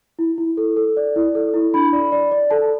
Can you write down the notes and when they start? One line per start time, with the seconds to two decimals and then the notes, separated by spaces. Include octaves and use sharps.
0.19 E4
0.38 E4
0.57 A4
0.77 A4
0.97 D5
1.16 E4
1.35 A4
1.54 E4
1.74 D4 B5
1.93 D5
2.12 D5
2.31 D5
2.50 A4 A5